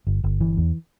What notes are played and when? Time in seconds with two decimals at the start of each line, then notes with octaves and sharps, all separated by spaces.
0.07 G1
0.24 G1
0.40 E3
0.57 E2